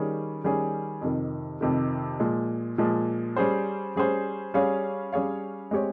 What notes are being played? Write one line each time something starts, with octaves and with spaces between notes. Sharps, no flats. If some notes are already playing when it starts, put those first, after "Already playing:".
Already playing: D#3 G3 C#4 G#4
D#3 G3 C#4 G#4
F2 C3 D#3
F2 C3 D#3
A#2 F3 G#3
A#2 F3 G#3
G3 C#4 G#4 C5
G3 C#4 G#4 C5
G3 C#4 G#4 C#5 F5
G3 C#4 G#4 C#5 F5
G#3 C4 G4 C#5